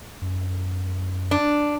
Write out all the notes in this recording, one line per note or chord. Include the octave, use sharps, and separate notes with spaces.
F#2
D4